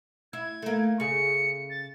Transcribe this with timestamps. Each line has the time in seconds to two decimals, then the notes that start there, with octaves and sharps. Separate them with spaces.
0.33 E4 G#6
0.62 A3 A#3
1.00 C#3 G#4 C#7
1.70 A6